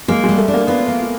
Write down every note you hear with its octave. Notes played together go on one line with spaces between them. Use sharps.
G#3 A#3
G3 G#3
A3
D4
A#3
B3 F4
A#3